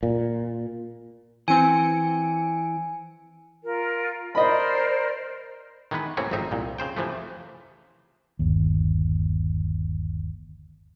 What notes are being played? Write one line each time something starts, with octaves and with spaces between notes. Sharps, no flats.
A#2
E3 C4 G#5 C#7 D7
F4 A#4
A#4 C5 D5 D#5 B5
D#3 E3 G#3 B3 B4
A2 C3 A#3 C4 C#4
G#1 F2 C4 D#4 E5
C2 A#2
C#3 C5 G5
C3 E3 F3 A3
G1 D#2